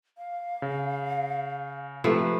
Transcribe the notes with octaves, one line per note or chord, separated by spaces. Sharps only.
F5
C#3
C3 F3 A3 B4 B5